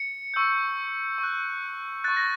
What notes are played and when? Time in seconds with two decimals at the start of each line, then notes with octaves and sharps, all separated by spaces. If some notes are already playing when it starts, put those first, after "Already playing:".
Already playing: C#7
0.34 C#6 E6 G6
1.18 C#6
1.23 F#6
2.04 C#6 F#6 A6
2.17 A#6